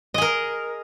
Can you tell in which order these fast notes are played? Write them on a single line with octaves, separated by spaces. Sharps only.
D#5 G#4 A#4